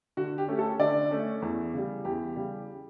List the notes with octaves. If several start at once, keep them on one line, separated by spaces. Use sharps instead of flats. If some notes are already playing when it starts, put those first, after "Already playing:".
D3 F#4
G4
A3 C#4
A4
D3 D5
A3 C#4
E2
C#3 G3
E2 G4
C#3 G3